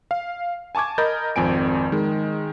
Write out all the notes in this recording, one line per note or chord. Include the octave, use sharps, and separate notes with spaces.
F5
G#5 A5 C#6 D6 G#6
A#4 D#5 B5 G6 A6
G#1 F2 C4 G#5 D7
D#3 G#3